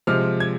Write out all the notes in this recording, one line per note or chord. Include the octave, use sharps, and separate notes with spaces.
C3 F3 G#3 F6
G#6